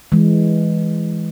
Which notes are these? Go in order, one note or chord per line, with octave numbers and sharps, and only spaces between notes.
E3 G#3